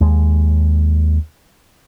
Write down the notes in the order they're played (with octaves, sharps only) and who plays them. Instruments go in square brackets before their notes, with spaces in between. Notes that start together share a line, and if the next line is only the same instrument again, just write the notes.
[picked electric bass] D#2 G#3